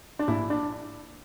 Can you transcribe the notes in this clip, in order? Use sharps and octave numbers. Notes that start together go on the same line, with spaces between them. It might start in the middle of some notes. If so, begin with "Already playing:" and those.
D4
A#1 E4
D4